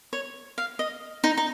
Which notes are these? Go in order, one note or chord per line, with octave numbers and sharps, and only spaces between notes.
C#5
F5
D#5
D#4
D#4